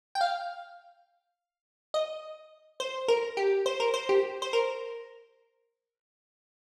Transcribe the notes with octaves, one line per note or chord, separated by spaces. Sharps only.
G5
F5
D#5
C5
A#4
G4
C5
A#4
C5
G4
C5
A#4